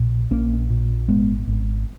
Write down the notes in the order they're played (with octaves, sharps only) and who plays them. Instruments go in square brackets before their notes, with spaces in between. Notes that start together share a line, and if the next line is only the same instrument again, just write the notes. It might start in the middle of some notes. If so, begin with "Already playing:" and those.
Already playing: [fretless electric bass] A#1 A#2
A#1 A#3 C#4
A#2
G#1 G#3 B3
G#1